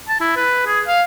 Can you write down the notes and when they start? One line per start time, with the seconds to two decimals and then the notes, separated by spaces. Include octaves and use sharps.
0.09 A5
0.20 E4
0.36 B4
0.66 G#4
0.87 F5